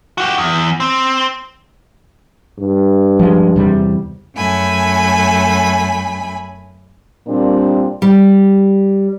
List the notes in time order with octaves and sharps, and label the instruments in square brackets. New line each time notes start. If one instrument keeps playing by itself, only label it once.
[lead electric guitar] F#4 G4
E2
C4
[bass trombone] G2
[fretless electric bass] F3 G#3
E2 C3 G3
[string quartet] F#2 A3 G#5 B5
[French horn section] A#2 G3 A#3 C4 D4
[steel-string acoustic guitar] G3